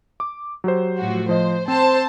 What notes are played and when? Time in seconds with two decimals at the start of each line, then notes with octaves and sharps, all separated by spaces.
0.20 D6
0.64 F#3 G4 C5
0.98 A2 F3 F#4
1.29 F3 C5 D#5
1.68 C4 C5 A5